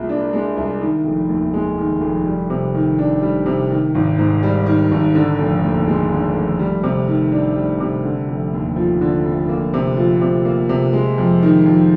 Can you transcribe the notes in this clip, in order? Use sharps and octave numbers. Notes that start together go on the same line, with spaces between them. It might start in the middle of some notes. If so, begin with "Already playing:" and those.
Already playing: C2 A#2 G#3
D4
G#3
C2
D#3
F1
D#2
G#3
D#3
F1
G3
C3
D#3
D4
G3
C3
D#3
G#1
G#2
G3
D#3
G#1
D3
F1
D#2
G#3
D3
F1
G3
C3
D#3
D4
G3
C3
D3
F1
D#2
F3
D3
F1
A#3
C3
F3
C3
A#3
C3
G#3
F2
D#3
F2